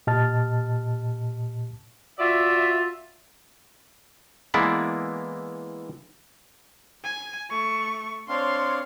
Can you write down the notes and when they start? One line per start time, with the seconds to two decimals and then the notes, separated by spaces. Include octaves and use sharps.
0.07 A#2 G4 D#5 A5 F6 A6
2.19 F4 F#4 D5 E5
4.54 E3 G#3 A#3 B3 E4 D5
7.04 G#5
7.50 A3 C#6
8.29 C4 D4 C#5 F5 C6